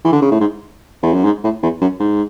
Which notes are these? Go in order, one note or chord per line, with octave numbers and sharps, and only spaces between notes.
E3
D3
C#3
A2
G#2
E2
F#2
G#2
A2
E2
F#2
G#2